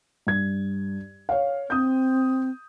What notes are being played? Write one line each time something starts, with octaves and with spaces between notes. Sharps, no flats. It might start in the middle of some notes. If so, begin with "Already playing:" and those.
G2 G#6
C#5 F5
C4 D#6 G6